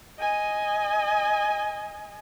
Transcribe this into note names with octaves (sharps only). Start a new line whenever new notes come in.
D#5 G#5